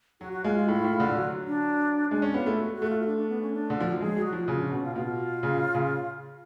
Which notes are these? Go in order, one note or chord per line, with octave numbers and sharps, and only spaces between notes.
F#3 F#4
F#4
G#3 F4
F4
A2
A2
D3
F#3 F#4
D4
G#3 D4
C#4
B3 F4
A3
F#4
F#4
A3
F4
F4
D4
D4
B3
C#4
D4
D3
F3 F4
F#3
G#3 G#4
F#3
F#4
F3
C#3 F4
D4
B2 C#4
F4
B2 F4
C#3
C#3